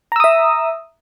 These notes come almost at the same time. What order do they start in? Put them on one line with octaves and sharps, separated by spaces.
A#5 E6 D#6 E5